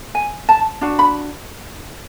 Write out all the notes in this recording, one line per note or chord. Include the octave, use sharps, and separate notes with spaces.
G#5
A5
D4 F#4
B5